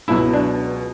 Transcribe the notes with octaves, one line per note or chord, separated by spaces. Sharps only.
C#2 B2 F#3 E4
D4